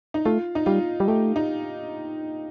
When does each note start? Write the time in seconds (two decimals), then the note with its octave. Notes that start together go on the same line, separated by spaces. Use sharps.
0.14 D#4
0.25 A3 F4
0.55 D#4
0.66 G3 F4
1.00 G3
1.08 A3 G4
1.36 D#4